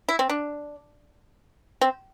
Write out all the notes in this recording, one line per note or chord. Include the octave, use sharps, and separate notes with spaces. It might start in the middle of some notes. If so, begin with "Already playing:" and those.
E4
C4
D4
C4